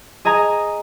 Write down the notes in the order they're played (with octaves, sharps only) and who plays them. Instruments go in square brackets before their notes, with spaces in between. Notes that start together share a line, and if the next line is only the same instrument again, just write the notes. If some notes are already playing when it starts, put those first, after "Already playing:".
[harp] G#4 D#5 G#5 A#5